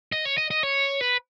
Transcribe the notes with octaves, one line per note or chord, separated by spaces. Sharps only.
D#5
C#5
D#5
D#5
C#5
B4